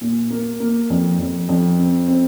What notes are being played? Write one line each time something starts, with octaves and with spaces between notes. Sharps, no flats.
A#2
A#3
A#3
F2
F2
F2
C4
C4